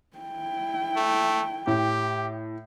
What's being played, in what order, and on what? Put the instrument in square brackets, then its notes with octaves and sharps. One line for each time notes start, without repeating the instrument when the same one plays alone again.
[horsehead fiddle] E4 G5
[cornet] A3
[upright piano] A2 [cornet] G4